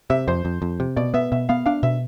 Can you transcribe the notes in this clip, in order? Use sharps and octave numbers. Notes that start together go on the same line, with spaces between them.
C3 E5
F2 C5
F2
F2
C3
B2 D5
B3 E5
B2 E5
B3 F5
D4 F5
B2 E5